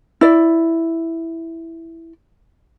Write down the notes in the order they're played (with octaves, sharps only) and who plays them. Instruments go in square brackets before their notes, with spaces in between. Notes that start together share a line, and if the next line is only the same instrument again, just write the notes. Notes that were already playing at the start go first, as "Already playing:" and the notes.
[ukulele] E4 D5